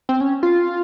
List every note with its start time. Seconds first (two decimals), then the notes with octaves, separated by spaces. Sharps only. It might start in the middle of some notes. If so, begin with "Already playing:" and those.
0.09 C4
0.21 C#4
0.43 F4